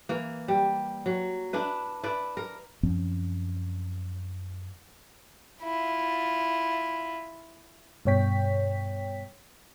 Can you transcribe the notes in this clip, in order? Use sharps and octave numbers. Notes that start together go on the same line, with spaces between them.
E3 A#3
G3
F#3
D4 E4 B4
E4 B4 D5
A#4
F#2 F3 C4 C#4
E4 F4
G2 B2 C#5 G5 B6